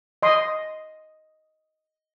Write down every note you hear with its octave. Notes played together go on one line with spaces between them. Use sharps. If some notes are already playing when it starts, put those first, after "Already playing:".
D#5 C6 D#6